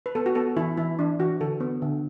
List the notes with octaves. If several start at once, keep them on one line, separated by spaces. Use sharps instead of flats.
B4
B3 A4
F#4
B3 A4
E3 E4
E3 E4
E3 D4
E3 F#4
D3 A4
B3
D3